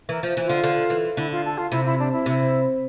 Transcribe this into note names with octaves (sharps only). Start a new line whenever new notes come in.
E3 A#4
F3
E3
D3 F4
D3
E3
D3 E4
F4
A4
F4
C3 E4
E4
D4
E4
C3